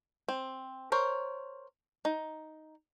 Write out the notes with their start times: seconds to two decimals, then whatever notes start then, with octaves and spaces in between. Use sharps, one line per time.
0.29 C4
0.92 A#4 C5 C#5
2.05 D#4